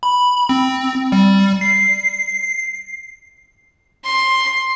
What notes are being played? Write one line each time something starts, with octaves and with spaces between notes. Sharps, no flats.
B5
C4
G3
C7
C6